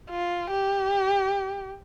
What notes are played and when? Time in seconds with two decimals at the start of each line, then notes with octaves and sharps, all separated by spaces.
0.11 F4
0.50 G4